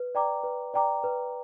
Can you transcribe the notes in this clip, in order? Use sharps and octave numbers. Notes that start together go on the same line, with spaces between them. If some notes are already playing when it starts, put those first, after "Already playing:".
Already playing: B4
D5 G5 A#5 D6
B4
D5 G5 A#5 D6
B4